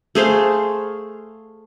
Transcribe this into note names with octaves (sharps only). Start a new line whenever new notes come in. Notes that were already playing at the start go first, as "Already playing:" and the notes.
A3 G#4 C5 F5